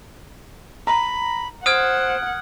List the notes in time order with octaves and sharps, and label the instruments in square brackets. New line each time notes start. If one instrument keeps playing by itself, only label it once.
[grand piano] A#5 [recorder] B5
[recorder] C5 [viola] F#5 [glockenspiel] D#6 F6 G#6 [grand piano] D7